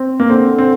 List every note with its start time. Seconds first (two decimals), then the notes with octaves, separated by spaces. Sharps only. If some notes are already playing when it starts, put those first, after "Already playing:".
Already playing: C4
0.20 A#3
0.29 D3 C4
0.58 C4